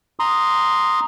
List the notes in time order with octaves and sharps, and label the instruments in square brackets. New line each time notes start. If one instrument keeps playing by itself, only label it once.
[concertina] A#5 C6 D#6